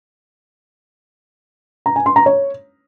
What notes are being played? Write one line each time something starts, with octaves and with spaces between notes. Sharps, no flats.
A#5
G#5
C6
A#5
C#5